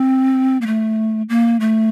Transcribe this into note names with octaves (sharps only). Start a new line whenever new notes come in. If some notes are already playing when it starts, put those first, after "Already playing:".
Already playing: C4
A#3
A3
A#3
A3